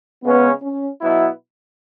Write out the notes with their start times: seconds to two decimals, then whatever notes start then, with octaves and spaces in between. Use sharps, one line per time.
0.24 C#3 G#3 B3 C#4
0.63 C#4
1.01 B2 F#3 B3 E4